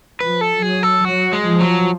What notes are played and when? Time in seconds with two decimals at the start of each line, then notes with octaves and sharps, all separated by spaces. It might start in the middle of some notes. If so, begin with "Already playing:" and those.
0.20 F3 B4
0.41 A4
0.62 F#3 G#4
0.83 A4
1.04 F#3 F#4
1.33 G#3
1.46 F3
1.60 F#3